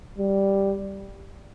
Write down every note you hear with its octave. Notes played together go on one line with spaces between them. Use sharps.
G3